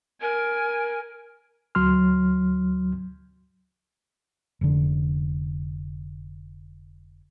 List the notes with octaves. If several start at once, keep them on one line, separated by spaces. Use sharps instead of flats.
A#4 G#5
D2 F#3 C6 F6
F1 D3